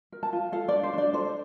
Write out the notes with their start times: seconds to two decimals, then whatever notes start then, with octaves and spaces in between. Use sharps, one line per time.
0.12 A#4
0.23 A5
0.33 F4
0.52 A4 F5
0.69 D4 D5
0.83 C5
0.94 D4 D5
1.13 A4 C5